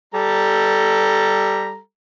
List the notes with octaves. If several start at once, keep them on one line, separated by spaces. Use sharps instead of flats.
G3 A4 A#5